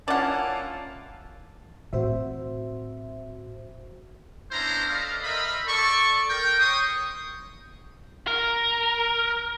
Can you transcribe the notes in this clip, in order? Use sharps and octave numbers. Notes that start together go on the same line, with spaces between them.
A#3 C#4 E4 F4 D5 F#5 A5
A2 C4 F#4 C5 E5
B3 C#4 D4 E4 C5 A#5
A4 B4 D5 D#5 F5
A#4 C5 D#5 E5 B5
A4 D5 C#6
A#4 G5
C#5 G5 C6 C#6 D#6
A#4